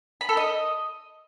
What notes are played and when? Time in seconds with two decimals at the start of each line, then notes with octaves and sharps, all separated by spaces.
0.21 B5
0.29 A4
0.37 D#5